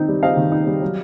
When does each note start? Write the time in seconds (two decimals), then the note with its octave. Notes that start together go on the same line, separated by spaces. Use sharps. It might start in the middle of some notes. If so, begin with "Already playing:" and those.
Already playing: D#3 C4 D#4
0.08 G3
0.23 C4 D#5 F5
0.37 D#3
0.52 D#4
0.67 G3
0.82 F#3